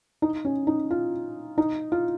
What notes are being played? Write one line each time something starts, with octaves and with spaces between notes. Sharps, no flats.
D#4
C#4
D#4
F4
D#4
F4